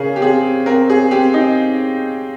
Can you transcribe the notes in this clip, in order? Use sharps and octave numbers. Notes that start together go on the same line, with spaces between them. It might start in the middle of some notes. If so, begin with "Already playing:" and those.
Already playing: C#3 G#4 A#4
G4
C4 G#4
C4 A#4
G#4
C4 G4
D#4